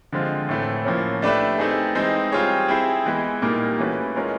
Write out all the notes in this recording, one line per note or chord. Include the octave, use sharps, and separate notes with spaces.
D3 F3 G#3 C4 F4
A2 E3 A3 C4
A2 F3 A#3 C#4
A3 D4 G4 B4 E5
A3 C4 D#4 G#4
E3 G#3 C4 D#4
G3 C4 F4 G#4 C#5
C4 E4 G#4 C5
E3 G#3 B3
A#2 G3 A#3 D#4
E3 A3 C#4 F#4 B4
G#3 C#4 F4 A#4